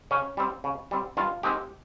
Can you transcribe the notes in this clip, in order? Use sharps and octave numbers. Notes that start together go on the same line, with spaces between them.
C#3 C#4
G3 C4
C#3
G3 C4
G2 F4
D#3 G#3 C4 G4